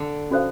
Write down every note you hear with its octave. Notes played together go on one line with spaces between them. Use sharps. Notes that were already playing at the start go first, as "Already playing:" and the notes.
Already playing: D3
C#4 F#4 A4 C5 F5